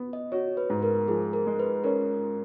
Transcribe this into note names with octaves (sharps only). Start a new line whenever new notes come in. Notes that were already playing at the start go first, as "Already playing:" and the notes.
Already playing: B3
D#5
F#4 C#5
B4
G#2
A#4
F3 G#4
A#4
G#3
B4
C#4 A#4